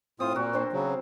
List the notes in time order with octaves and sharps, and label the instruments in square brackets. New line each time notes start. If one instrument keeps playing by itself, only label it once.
[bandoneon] A2 F4 D#6 [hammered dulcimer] C4
[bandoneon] A#2 [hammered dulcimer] F#4 A#4
[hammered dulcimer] C4 D4 C5
[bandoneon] C#3 F#3